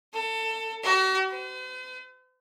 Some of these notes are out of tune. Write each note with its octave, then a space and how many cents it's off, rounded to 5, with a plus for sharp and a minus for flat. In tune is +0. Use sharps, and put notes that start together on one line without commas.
A4 +25
F#4 +40
C5 -45